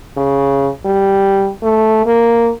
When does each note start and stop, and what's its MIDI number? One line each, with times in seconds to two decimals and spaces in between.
0.17 0.69 49
0.85 1.50 55
1.63 2.05 57
2.06 2.50 58